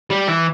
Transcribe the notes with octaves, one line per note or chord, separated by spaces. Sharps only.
G3
E3